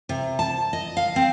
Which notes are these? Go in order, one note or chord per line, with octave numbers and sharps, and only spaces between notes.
C3
A5
D#5
F5
C4